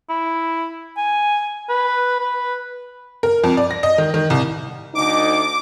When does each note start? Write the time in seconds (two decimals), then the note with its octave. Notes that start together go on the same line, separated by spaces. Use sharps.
0.09 E4
0.97 G#5
1.69 B4
2.19 B4
3.23 A#4
3.44 F2
3.57 D5
3.71 A#6
3.83 D#5
3.98 D#3
4.14 D#3
4.30 C2
4.95 D2 D#4 D6